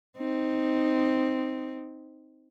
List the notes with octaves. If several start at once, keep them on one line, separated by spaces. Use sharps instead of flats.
C4 D#4